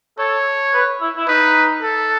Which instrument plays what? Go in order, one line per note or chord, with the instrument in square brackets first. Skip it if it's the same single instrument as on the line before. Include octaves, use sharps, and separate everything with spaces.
[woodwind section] A4 [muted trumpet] C#5
[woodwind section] B4
E4
E4
[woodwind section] D#4 [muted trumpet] B4
[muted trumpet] A4